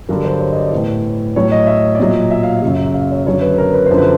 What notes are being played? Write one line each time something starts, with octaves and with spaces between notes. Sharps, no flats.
G2 D3 F#3 A#4
C5
C#5
D#5
D5
A2 E3
A2 F#3 C#5
D#5
E5
D5
A#2 F#3 D#5
E5
F5
E5
F#2 C#3 F#3
F5
C#5
F#2 D3 F#3 C#5
B4
A#4
B4
F#2 D3 F3 C5
B4